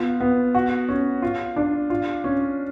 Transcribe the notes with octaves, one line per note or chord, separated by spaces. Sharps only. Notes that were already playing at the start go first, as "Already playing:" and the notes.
Already playing: B3 F4
B3
F#4
C#4
F4
D4
F4
C#4